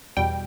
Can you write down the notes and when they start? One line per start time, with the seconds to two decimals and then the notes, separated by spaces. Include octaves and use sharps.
0.17 E2 B2 G3 G5